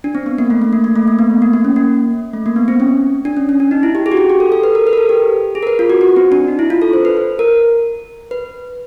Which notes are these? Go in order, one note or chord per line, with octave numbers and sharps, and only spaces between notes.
D4
C4
B3
A#3
A3
A3
A#3
A#3
A3
A#3
B3
A3
A#3
A#3
C#4
A#3
A3
A#3
B3
C4
C#4
D4
C#4
C#4
D4
D#4
E4
G4
G#4
F#4
G4
G4
A4
A4
B4
A#4
B4
A#4
A4
G4
G#4
A#4
B4
F4
F#4
F#4
C4
D4
D#4
E4
F4
A4
C5
B4
B4
A#4
B4